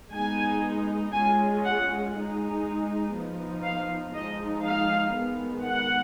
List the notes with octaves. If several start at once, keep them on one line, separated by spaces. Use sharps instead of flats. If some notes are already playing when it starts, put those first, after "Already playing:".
G#3 B3 D#4 G#5
G#3 C#4 F4 G#5
F#5
G#3 D#4
F3 B3 D#4
F5
F3 G#3 D#4 D#5
F5
D#3 G#3 B3
F#5